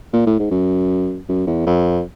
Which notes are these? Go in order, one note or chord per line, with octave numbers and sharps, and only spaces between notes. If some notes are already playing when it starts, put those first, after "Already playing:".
A#2
A2
G#2
F#2
F#2
E2
F2